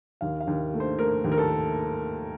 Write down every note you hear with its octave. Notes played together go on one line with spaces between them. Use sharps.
D#2 F5
F5
D#2
A3
C5
A3 A#4
D#2
A#4
A4